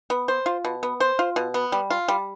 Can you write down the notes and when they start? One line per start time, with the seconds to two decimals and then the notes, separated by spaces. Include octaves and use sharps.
0.10 B3
0.28 C5
0.46 F4
0.65 B2
0.83 B3
1.00 C5
1.19 F4
1.36 B2
1.54 B3
1.72 G3
1.91 F4
2.08 G3